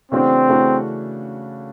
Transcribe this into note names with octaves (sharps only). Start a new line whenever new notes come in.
C#3 E3 A3 C4 D4 F#4
C#3 E3 A3 D4 F#4